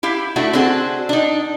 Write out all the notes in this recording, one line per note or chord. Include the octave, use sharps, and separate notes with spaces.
E4 G4 F5
A3 D4 E4 F#4
C4 D4 F#4 G#4 A4
D4 D#4